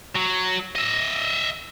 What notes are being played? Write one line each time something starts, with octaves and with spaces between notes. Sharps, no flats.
F#3
D#5 E5